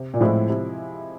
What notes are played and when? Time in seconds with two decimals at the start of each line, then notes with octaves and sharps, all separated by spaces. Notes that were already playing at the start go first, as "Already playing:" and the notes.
Already playing: C3
0.14 A#2
0.20 A2 F3 G#3 C4 E4
0.49 C3